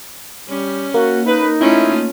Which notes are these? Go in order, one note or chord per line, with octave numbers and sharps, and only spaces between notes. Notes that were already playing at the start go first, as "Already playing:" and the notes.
G3 C#4
A#3 F#4
D#4 B4
A3 C#4 E4 F4